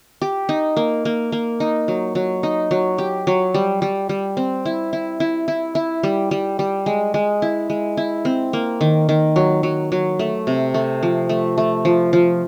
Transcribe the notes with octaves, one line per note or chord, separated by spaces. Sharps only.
G4
D#4
A#3
A#3
A#3
D#4
F#3
F#3
D#4
F#3
G4
F#3
G3
G3
G3
C4
E4
E4
E4
E4
E4
G3
G3
G3
G#3
G#3
E4
G#3
E4
C4
A#3
D#3
D#3
F#3
F#3
F#3
A3
C3
A3
F3
A3
A3
F3
F3